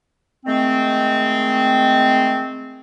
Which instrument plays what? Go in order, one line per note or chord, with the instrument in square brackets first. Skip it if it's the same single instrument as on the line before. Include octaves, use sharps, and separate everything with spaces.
[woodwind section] D#3 G#3 A3 C4